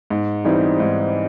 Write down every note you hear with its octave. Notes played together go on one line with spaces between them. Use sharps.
G#2
E3 G3 C4 D#4
G#2